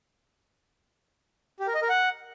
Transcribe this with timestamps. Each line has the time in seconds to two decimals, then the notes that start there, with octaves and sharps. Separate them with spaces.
1.60 G4
1.67 A#4
1.74 D#5
1.82 A#4
1.89 F#5